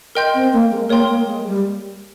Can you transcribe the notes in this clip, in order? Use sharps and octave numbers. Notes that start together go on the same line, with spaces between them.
A#4 D#5 G5 C6 G6
C4
A#3
G#3
A#3 A#4 C#5 G5 C6
A#3
G#3
G3